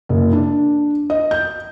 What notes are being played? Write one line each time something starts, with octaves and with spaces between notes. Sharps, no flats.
F#1
D4
D#5
G6